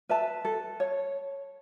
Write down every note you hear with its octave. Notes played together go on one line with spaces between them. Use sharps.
B4 E5 A5
A4
C#5